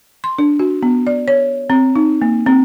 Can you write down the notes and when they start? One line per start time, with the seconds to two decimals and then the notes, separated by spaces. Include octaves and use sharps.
0.24 C6
0.39 D4
0.59 F#4
0.83 B3
1.07 D5
1.28 C#5
1.70 C4
1.96 D#4
2.22 A#3
2.46 C4